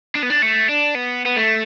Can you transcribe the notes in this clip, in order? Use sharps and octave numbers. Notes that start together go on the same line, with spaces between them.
D4
B3
D4
A3
D4
B3
B3
A3